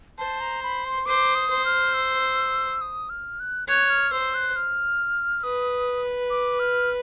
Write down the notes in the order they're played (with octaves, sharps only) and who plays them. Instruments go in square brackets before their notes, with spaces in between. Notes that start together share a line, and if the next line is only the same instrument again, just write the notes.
[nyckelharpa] C5 [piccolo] A5
[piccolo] A#5
B5
C6
[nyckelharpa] C5 [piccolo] D6
[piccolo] D#6
[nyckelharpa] C5
[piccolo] F6
E6
D#6
F6
F#6
[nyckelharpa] C#5 [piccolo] F#6
[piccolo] F6
[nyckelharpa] C5 [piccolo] E6
[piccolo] F#6
F6
[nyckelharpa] B4 [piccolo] D#6
[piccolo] D6
F6